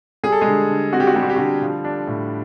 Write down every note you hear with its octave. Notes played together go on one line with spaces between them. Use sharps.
G3 G#4
A4
G#3 G#4
D3
D3
C4 F#4
G4
F#4
G3 G4
F#4
G4
D3 F#4
F3
D4
A2